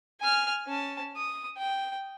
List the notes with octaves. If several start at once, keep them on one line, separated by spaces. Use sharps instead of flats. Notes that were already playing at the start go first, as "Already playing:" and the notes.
G#5 F6
C#4 A5
D#6
G5